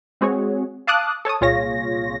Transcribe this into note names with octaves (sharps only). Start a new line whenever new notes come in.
G#3 C4 F#4 G#4 C#5
F5 A5 D6 D#6 F#6
A4 C#5 A5 D#6
C2 A#2 F4 G#4 C#5 A#6